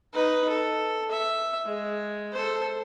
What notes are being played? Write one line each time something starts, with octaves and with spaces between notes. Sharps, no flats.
D#4 B4
A4
E5
G#3
A4 C5